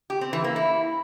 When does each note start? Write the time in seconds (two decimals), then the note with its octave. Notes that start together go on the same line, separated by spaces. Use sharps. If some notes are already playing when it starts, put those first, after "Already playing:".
0.10 G4
0.21 C4
0.33 E3
0.44 A#3
0.56 E4